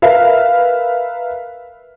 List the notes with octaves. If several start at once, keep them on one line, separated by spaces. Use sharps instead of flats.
A#4 B4 E5 F5